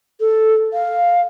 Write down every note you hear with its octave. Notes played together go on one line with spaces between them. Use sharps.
A4
F5